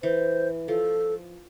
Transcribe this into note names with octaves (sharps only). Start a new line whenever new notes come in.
E3 C5
F3 A4